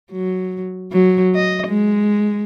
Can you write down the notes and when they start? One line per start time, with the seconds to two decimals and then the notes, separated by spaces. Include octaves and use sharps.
0.12 F#3
0.92 F#3
1.35 D#5
1.68 G#3